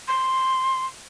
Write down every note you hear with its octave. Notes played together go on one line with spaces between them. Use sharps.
C6